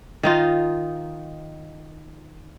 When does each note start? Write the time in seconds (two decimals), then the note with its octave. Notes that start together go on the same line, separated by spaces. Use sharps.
0.23 D#3 D#4 F4